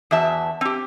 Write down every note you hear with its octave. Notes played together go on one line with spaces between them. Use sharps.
E2 F#4 E5 A5
C4 G4